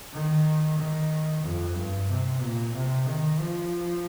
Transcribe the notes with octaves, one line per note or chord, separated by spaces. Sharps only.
D#3
D#3
F2
G2
C3
A#2
C3
D#3
F3